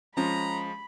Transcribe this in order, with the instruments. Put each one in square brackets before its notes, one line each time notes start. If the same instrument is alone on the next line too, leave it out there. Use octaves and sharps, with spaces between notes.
[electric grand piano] F3 G#3 [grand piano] C#4 [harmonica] A#5 [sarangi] B5